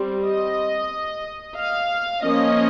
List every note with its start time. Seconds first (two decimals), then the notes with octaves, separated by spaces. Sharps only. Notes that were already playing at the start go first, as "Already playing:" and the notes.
Already playing: G3 C4
0.23 D#5
1.56 F5
2.23 F3 A#3 C#4 D#5